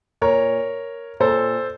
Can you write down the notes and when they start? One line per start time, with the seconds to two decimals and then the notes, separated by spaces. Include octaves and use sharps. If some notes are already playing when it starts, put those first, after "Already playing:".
0.21 A#2 A#4 C#5
1.20 A#2 A4 C5